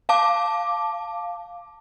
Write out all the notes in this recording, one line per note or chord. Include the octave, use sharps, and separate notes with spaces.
F5 A5 D6